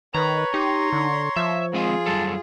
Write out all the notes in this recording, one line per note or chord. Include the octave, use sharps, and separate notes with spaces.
D#3 B4 C#5 A#5
D#4 G4 A#5 C6
D3
F3 E5
G#3 C4 F4 G#4 D#5
F#2 G3 A4 A5